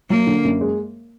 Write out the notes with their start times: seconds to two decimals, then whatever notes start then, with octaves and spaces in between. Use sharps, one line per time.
0.10 F#3 A#3
0.27 D3
0.44 F#2
0.61 G#3